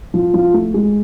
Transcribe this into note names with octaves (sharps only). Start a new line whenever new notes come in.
F3
F3
A3
G#3